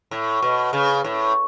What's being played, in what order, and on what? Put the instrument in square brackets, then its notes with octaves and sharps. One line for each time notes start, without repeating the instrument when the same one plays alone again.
[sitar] A2
B2
C#3
A2